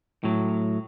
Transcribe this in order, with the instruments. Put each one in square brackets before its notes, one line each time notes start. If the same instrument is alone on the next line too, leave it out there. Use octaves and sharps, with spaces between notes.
[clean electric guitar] A2 F#3